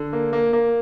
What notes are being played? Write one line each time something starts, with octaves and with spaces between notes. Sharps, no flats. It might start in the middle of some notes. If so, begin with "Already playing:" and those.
Already playing: D3
A#3
A#3
A#3